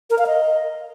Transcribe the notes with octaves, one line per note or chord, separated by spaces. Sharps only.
A#4
F5
D#5